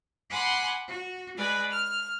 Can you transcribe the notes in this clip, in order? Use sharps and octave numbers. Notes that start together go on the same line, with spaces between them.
F#5 G#5 B5 C6 D6
F#4
G#3 B4 D5 G#5
F6